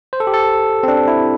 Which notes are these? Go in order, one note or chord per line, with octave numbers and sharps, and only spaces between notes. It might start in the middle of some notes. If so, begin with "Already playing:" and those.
C5
A4
G4
A4
C4
D4
E4